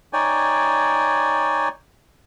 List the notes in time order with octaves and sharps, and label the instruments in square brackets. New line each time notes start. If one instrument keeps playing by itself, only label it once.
[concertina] D#4 C#5 D5 G5 G#5